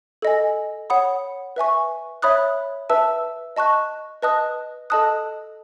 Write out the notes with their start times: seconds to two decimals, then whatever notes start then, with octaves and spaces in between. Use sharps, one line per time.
0.22 A4 D#5 G#5
0.90 C#5 F#5 B5 D#6
1.56 B4 E5 G#5 C#6
2.22 C#5 E5 B5 D#6 F#6
2.90 B4 E5 A5 E6
3.56 D#5 A5 C#6 F#6
4.22 B4 D#5 A5 D#6 F#6
4.90 A4 D#5 A5 D#6 F#6